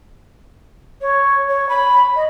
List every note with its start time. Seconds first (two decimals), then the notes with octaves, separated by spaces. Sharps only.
1.02 C#5
1.49 C#5
1.69 B5
2.16 D#5